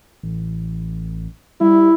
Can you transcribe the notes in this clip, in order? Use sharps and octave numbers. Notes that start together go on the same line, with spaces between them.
A1
G3 E4